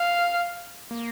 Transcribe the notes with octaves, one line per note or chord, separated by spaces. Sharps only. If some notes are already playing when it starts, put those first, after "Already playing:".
Already playing: F5
A#3